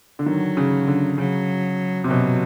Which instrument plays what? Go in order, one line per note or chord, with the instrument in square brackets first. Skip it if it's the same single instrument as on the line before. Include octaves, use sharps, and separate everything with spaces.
[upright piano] D3
[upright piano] D#3 [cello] F#3
[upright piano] C#3
D3
[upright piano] C#3 [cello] F#3
[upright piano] C3
[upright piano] B2 [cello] F#3